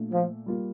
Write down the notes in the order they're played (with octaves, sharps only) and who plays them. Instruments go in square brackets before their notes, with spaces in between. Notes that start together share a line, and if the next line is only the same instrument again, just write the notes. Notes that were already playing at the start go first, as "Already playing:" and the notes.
Already playing: [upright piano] A#2 A3 D4
[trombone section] F3
[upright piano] G3 A#3 F4